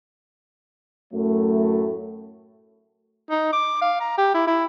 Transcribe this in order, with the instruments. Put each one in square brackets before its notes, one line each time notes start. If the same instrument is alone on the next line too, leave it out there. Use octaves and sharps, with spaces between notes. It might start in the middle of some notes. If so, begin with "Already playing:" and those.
[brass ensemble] F#2 A2 F#3 A3
[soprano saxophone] D#4
D6
F5
A#5
G4
E4
E4